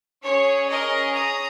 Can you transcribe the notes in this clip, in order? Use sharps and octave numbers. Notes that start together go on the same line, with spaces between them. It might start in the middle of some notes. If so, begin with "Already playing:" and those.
C#4 G#4 C#5
A#4 D#5
A#5 D#6